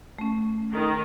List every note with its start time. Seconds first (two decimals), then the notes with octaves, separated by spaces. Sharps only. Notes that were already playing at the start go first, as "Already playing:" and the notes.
0.18 A3 C#4
0.72 D#3